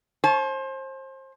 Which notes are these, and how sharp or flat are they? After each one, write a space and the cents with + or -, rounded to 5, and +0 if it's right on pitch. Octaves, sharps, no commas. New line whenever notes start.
C5 +30 A5 -40